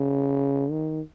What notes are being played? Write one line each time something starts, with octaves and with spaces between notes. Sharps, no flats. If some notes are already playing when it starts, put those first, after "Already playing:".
Already playing: C#3
D#3